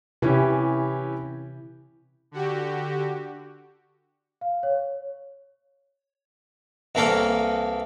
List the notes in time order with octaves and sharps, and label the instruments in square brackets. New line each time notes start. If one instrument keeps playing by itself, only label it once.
[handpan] C3 E4 [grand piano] E3 C#4 G4
[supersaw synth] D3 F#4 G4
[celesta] F5
C#5
[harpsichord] C2 E3 A#3 A4 A#4